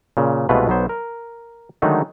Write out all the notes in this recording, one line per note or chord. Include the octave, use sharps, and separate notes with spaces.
A#2 C#3
C2 B2 G#3 A3 F4 B4
B1 F#3 B3 C5
A#4
D3 D#3 F#3 G#3 A3 D#4